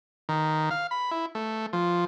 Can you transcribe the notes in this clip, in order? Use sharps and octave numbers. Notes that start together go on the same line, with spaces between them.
D#3
F5
B5
E4
A3
F3